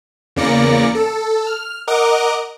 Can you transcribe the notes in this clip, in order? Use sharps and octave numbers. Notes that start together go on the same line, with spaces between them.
E2 C#3 A#3 D5 A#6 C#7
A4
F6
A#4 D#5 F#5 D6